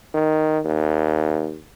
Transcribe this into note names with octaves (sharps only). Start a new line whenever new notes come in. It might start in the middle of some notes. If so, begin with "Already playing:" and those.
D#3
D#2